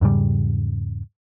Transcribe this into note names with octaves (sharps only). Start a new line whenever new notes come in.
E2 G#2 C#3 G3